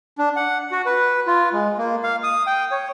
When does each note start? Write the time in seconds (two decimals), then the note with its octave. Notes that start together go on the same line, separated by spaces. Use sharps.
0.18 D4
0.36 F#5
0.72 F#4
0.86 B4
1.27 F4
1.53 G#3
1.78 A#3
2.04 F5
2.24 D#6
2.47 G5
2.71 C#5